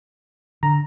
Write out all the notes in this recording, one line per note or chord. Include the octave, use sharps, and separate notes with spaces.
D3 A#5